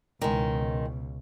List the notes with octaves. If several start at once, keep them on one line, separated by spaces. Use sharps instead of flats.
C#2 B2 D#3 G#3